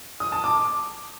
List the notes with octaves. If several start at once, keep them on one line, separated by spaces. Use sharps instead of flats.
D#6
A5
D6
D6